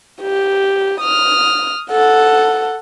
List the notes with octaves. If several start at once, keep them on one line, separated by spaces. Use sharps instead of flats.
G4
D#6 F6
A4 F#5